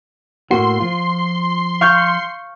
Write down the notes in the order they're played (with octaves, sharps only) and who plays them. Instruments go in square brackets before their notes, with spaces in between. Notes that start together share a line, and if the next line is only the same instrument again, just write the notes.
[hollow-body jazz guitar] A2 A#3 F#4 [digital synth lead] C6
[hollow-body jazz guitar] F3 F4
[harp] F5 C#6 G6